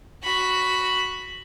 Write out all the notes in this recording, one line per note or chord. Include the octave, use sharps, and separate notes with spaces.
F#4 B5